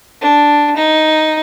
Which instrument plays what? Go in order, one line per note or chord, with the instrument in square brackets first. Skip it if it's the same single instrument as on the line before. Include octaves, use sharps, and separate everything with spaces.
[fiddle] D4
D#4